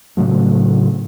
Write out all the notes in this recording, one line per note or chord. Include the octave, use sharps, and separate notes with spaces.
A2 C#3 F#3 A3